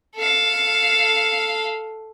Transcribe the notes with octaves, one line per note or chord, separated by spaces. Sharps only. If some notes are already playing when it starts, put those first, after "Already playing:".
A4 F5